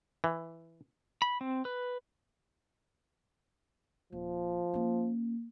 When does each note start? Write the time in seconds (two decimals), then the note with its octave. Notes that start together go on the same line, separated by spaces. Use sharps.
0.24 E3
1.22 B5
1.41 C4
1.65 B4
4.12 D#1 F3
4.74 A#3 C#4